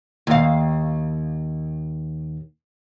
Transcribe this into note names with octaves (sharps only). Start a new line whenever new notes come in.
D#2 F5